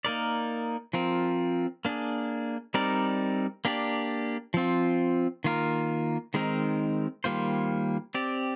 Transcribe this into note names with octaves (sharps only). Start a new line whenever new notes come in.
A#3 D#4 A#4 D5
F3 C4 F4 A#4
A#3 D4 G#4
G3 C4 D#4 A#4 D5
A#3 D4 G4 D5
F3 C4 F4
D#3 A#3 F4 A#4
D#3 G#3 C4 D#4 A#4
D#3 G3 A#3 F4 C5
C4 G4 D5